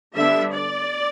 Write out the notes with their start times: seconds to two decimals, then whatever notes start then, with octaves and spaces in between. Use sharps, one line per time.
0.15 D3 G3 B3 D4 E5
0.52 D5